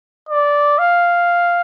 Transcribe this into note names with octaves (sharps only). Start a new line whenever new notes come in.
D5
F5